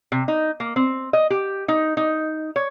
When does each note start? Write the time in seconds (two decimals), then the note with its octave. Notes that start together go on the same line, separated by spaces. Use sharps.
0.12 C3
0.28 D#4
0.60 A#3
0.76 C4
1.13 D#5
1.30 G4
1.68 D#4
1.97 D#4
2.56 C#5